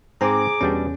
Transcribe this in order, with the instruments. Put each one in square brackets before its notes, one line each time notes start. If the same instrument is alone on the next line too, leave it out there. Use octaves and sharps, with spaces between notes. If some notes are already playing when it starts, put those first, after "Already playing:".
[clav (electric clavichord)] G#2 C4 [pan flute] G#4 [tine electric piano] G#5 A#5 [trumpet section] D6
[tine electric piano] E2 C#4 [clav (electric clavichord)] B2 G3 D4